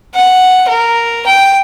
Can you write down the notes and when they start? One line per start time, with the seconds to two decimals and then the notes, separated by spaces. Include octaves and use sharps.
0.14 F#5
0.68 A#4
1.26 G5